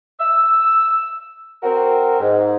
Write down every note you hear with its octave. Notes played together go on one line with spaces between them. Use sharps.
E6
C4 F#4 A#4
G#2